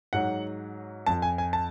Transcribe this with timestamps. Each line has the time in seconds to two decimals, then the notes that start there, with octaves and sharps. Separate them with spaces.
0.13 G#2 F#3 F#5
1.06 F2 F3 A5
1.22 G#5
1.38 G#5
1.53 A5